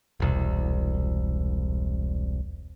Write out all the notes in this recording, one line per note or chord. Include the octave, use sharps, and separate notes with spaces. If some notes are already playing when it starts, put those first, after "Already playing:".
E1 C2